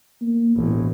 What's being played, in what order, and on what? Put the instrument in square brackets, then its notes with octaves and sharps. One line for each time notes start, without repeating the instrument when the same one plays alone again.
[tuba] A#3
[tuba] E1 [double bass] A1